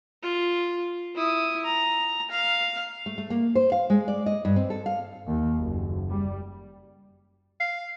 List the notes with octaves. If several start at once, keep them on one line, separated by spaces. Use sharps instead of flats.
F4
E4 D#6
A#5
F5
A3
A3
A#3
C5
F5
G#3
D5
D#5
G2
C4
A4
F5
D#2
F#1
G3
F5